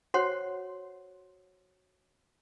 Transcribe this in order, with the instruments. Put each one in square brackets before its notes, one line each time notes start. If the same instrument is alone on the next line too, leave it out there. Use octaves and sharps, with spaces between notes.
[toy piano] F#4 C5 C#5 F#5 C6